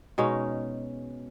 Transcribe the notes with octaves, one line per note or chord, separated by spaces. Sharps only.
B2 G#3 C#4 D#4